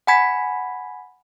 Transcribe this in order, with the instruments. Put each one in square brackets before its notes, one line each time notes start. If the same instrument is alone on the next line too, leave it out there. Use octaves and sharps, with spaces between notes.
[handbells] F#5 G#5 B5 G#6 B6